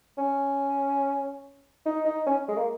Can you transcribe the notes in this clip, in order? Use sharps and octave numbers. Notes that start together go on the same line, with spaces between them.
C#4
D#4
D#4
C#4
G#3
A#3